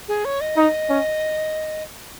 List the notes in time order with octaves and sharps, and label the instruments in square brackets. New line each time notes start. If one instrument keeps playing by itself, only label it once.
[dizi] G#4
C#5
D#5
[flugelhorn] D#4
C#4